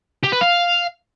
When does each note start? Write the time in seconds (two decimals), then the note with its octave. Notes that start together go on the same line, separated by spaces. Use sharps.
0.24 G4
0.33 B4
0.41 F5